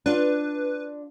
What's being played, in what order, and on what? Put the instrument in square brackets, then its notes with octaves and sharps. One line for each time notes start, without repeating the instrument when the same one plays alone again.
[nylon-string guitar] D4 F4 [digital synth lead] B4